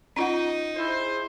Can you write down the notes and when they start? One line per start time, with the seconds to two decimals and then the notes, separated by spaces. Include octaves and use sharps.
0.16 C#4 D#4 F4 F#5
0.76 E4 G#4 C5